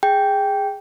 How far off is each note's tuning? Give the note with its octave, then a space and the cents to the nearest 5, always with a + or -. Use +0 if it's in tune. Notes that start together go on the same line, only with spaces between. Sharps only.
G#4 -10 G5 +0